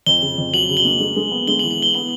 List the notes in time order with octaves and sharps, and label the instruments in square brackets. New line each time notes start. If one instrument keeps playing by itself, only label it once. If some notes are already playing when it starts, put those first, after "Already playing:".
[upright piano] F2 [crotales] G7
[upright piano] C#3
F2
[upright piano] F#3 [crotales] F#7
[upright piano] C#3
[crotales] G7
[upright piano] A#3
G#3
G#3
B3
[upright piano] G#3 [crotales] G7
[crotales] F#7
[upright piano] E3
[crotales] F#7
[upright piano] E3 [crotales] G7
[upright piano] B3 [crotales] F#7